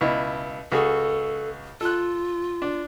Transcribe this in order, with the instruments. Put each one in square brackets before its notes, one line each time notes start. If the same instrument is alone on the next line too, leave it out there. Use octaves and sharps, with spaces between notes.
[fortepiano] C#2 B2 E4
[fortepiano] C#2 F#4 G#4 [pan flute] A4
[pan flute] F4 [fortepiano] A4 F#6
[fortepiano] D4